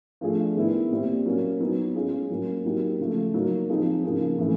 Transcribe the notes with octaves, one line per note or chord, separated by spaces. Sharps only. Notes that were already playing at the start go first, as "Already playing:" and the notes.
F3 A3 D4 F4 G#4
D#3 G#3 B3 E4
A#2 G3 C4
F#3 A#3 C#4
F#3 B3 D#4
G#3 C#4 F4 G#4
F#3 A#3 C#4
F#3 A#3 D#4 G4
C#3 F3 A3
F#3 A#3 D#4
F3 G#3 C4 D#4
C#3 F3 A#3 D#4 G#4
C#3 E3 A3